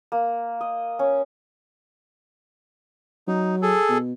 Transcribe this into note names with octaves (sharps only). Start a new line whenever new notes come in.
A#3
D#5
C#4
F#3 D#4
G#4 A4
B2